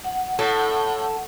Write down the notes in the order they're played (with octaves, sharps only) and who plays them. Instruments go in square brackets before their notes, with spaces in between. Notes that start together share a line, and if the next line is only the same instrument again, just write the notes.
[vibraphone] F#5
[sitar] A2 [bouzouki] A4